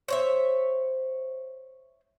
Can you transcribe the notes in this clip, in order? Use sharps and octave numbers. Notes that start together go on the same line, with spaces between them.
C5 C#5 E5